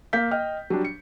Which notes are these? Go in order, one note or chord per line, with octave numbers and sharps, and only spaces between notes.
A#3 F5 G6 B6
D#5 G5 F6
F#3 G3 D4
C#7